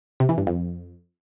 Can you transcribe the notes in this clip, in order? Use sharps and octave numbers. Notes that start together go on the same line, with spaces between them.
C3
E3
G2
F2